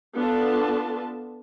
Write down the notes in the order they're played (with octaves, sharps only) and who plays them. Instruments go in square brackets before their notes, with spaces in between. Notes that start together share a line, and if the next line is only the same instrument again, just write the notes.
[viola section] B3 D4 F4 A4 A5